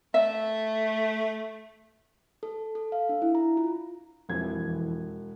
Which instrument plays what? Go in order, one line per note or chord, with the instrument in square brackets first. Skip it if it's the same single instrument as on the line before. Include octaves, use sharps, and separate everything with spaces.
[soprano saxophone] A3 [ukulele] E5
[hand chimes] A4
A4
F5
D4
E4
A#5
F4
[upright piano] E1 G#6 [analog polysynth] F2 E3